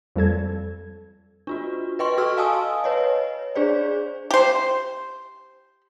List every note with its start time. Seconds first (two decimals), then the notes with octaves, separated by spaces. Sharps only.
0.16 F2 G3 A4 G#6
1.47 D4 F4 F#4
1.99 B4 D#5 G5 C6 C#6
2.18 F#4 A4 C6 C#6 E6 F6
2.37 D#5 F5 G#5 A5 D#6 E6
2.84 B4 C#5 D#5
3.55 D4 G#4 C5 D5
4.31 G4 C5